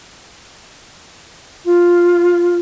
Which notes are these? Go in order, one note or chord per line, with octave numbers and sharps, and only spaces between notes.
F4